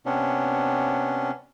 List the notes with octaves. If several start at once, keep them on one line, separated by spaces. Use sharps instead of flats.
C3 B3 C#4 D4